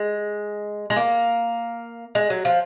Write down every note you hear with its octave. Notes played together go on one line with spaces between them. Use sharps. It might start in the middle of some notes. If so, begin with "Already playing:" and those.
Already playing: G#3
G#3
A#3
G#3
F#3
F3